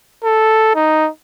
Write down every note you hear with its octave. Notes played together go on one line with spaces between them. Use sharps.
A4
D#4